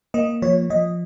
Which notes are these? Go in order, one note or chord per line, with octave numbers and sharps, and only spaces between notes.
A#3 D#5
F3 C#5
F3 D#5